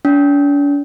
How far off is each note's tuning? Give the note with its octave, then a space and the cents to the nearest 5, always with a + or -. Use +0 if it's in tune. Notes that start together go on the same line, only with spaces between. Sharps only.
D4 -45